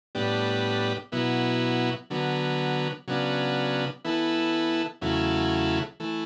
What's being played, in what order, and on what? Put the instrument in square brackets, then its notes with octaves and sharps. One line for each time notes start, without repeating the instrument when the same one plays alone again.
[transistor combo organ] A2 G3 B3 D4 G4
B2 F#3 B3 E4
D3 F#3 B3
C#3 F#3 B3 D4
E3 B3 E4 A4
E2 C#3 F#3 A3 E4
E3 A3